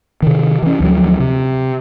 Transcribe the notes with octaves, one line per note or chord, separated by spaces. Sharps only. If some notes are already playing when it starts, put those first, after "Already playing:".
C3 D#3
E3 C#4
D2 F3 F#3
C3